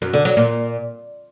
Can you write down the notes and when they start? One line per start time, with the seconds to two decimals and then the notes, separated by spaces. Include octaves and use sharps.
0.02 F#2
0.13 D3
0.25 F#3
0.37 A#2